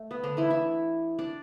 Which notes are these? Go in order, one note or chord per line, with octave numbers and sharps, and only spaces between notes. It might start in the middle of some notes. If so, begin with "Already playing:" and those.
Already playing: A3
B3
D3 D4
E3 E4
E4 E5
D4 D5